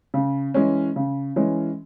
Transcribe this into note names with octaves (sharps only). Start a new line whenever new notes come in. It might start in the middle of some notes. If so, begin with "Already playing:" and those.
C#3
E3 G#3 C#4
C#3
E3 G#3 C#4